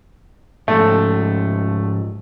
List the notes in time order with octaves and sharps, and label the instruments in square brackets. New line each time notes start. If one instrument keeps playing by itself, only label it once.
[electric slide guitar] G#2 F3 [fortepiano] A3 A4